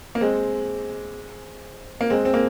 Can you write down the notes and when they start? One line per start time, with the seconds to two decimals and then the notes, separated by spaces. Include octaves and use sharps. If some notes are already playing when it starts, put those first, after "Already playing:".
0.15 A#3
0.21 G#3 C4
2.01 A#3
2.10 G#3 C4
2.25 C4
2.34 A#3